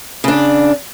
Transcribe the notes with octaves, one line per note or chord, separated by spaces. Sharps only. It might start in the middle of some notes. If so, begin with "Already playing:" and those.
C#3 D4